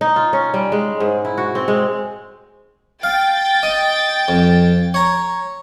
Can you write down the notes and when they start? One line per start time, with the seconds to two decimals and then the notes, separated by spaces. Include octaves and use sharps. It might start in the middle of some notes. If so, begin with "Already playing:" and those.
0.01 D#4
0.16 F4
0.33 C#4
0.54 G3
0.72 G#3
1.00 G#2
1.25 E4
1.38 F#4
1.55 C4
1.68 G#3
3.03 F5 G5 A6
3.63 D#5
4.28 F2
4.94 C#5 A#5